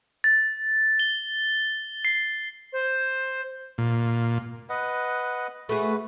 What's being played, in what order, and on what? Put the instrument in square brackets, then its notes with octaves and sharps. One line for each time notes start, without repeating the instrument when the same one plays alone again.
[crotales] A6
G7
C7
[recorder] C5
[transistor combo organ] A#2
[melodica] B4 D#5 F#5
[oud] A3 G#4 [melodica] F#4 B4